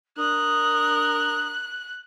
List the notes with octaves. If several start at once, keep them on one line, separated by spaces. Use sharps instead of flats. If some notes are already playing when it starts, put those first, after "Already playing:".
D4 A#4 D#6 F#6